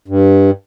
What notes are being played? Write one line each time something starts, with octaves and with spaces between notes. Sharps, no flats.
G2